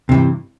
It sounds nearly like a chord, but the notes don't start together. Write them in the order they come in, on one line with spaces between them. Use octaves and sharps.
C3 E3 G2